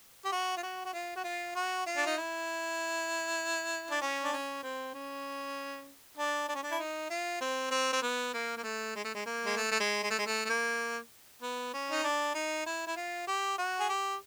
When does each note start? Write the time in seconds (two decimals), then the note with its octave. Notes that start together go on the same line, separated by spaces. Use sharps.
0.25 G4
0.32 F#4
0.57 F4
0.63 F#4
0.85 F#4
0.93 F4
1.16 F#4
1.24 F4
1.56 F#4
1.86 F4
1.97 D4
2.06 D#4
2.17 E4
3.91 D4
4.02 C#4
4.23 D4
4.33 C#4
4.64 C4
4.94 C#4
6.18 D4
6.49 D4
6.55 C#4
6.63 D4
6.71 E4
6.79 D#4
7.10 F4
7.41 C4
7.71 C4
7.93 C4
8.02 B3
8.34 A#3
8.57 A#3
8.64 A3
8.96 G#3
9.05 A3
9.15 G#3
9.26 A#3
9.45 G#3
9.56 A3
9.71 A3
9.80 G#3
10.03 G#3
10.10 A3
10.18 G#3
10.26 A3
10.45 A3
10.49 A#3
11.42 B3
11.73 C#4
11.92 D#4
12.03 D4
12.34 D#4
12.66 E4
12.87 E4
12.96 F4
13.27 G4
13.58 F#4
13.80 G#4
13.89 G4